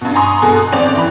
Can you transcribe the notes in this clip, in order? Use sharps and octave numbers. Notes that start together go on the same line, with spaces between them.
G2 B2
G#5 A#5 C6 C#6 D#6
B2 G#3 A4 G#5
F#6
G#1 C4 C#4 D5 G5 F7
E3 B5